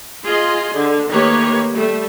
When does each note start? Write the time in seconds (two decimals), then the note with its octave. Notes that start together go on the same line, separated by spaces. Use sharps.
0.24 F4 G#4 D#5 C6
0.74 D3
1.09 D#3 A3 A#3 G4 B4 C#5
1.72 G3 A3